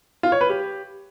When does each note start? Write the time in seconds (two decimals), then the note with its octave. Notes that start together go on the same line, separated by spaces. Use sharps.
0.23 F4
0.32 C#5
0.41 B4
0.50 G4